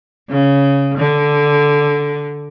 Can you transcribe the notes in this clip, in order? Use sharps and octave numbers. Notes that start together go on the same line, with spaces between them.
C#3
D3